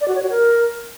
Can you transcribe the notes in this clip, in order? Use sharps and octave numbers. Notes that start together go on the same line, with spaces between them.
D5
F#4
C#5
F#4
A#4